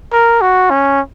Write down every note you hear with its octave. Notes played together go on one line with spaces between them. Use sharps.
A#4
F#4
C#4